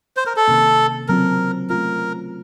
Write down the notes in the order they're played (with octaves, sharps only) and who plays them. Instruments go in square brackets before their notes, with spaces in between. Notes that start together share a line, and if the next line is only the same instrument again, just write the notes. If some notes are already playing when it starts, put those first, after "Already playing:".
[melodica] C5
A#4
A4
[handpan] C3 D#3 A#3 C#4
[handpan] C#3 F#3 C4 F4 [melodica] A#4
[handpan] A3 C#4 F4 [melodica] A#4